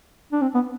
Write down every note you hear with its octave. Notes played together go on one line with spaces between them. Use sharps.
D4
C4
B3